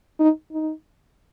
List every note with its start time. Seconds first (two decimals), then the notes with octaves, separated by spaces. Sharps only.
0.20 D#4
0.52 D#4